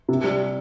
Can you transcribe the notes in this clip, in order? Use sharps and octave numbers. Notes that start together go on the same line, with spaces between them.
C3
G3